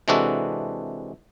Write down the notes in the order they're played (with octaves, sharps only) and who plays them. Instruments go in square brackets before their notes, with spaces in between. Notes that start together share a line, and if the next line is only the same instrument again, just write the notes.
[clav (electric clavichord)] C3 E3 G#3 D4 F#4 A4